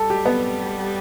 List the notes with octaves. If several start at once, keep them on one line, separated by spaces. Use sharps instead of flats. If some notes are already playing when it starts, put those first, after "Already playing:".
Already playing: G3 A4
G4
B3